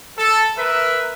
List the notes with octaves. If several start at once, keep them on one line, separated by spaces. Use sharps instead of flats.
A4
A#4 B4 E5